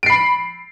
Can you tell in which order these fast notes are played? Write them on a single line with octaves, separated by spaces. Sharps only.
D7 C7 B5